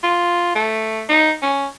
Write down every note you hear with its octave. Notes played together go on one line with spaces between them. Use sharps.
F4
A3
D#4
C#4